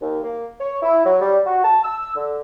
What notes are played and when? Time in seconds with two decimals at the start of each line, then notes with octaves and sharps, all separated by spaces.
0.01 D#2
0.23 A#3
0.60 C#5
0.82 E4
1.05 F#3
1.20 G3
1.46 F#4
1.64 A5
1.83 E6
2.15 D3